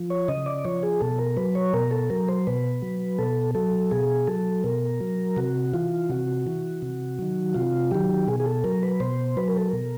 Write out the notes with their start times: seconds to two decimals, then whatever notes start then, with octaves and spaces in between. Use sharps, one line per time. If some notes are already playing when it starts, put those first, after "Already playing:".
Already playing: F3
0.10 C#5
0.28 C#3 D#5
0.46 D5
0.65 F3 C#5
0.83 G#4
1.00 B2 A4
1.18 A#4
1.37 F#3 B4
1.55 C#5
1.74 B2 A#4
1.91 A4
2.10 F#3 A#4
2.28 C5
2.47 B2 B4
2.82 F#3
3.19 B2 A4
3.55 F#3 A4
3.91 B2 G#4
4.27 F#3 A4
4.64 B2 A#4
5.00 F#3
5.36 C3 F#4
5.73 E3 F4
6.10 C3 F#4
6.47 E3
6.82 C3
7.19 D#3 F#3
7.55 C3 F4
7.91 D#3 F#3 G4
8.28 B2 G#4
8.40 G#4
8.46 A4
8.64 F#3 A#4
8.83 B4
9.00 B2 C5
9.37 F#3 B4
9.48 A#4
9.57 A4
9.68 B2 A#4